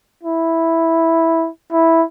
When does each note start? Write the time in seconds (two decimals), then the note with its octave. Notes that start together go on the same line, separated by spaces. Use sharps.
0.24 E4
1.73 E4